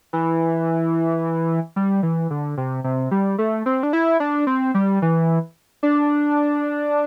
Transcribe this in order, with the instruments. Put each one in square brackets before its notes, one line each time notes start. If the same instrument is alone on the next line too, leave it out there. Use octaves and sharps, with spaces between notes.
[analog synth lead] E3
G3
E3
D3
C3
C3
G3
A3
C4
D4
E4
D4
C4
G3
E3
D4